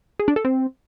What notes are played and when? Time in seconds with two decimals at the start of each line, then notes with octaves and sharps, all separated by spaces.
0.19 G#4
0.28 D4
0.36 A4
0.45 C4